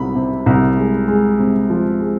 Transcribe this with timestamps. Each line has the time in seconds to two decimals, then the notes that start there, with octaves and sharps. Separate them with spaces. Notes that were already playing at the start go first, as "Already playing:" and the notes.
Already playing: C2 B5
0.15 C3
0.46 C2
0.77 G#3
1.08 G#3
1.39 C3
1.70 F3
2.01 G#3